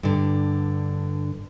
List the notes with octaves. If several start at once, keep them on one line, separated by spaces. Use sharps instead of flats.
G2 D3